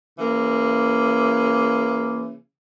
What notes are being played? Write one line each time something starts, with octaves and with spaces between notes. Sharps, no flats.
C#3 E3 A#3